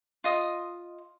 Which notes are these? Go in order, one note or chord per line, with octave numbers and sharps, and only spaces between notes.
F4 D#5 D#6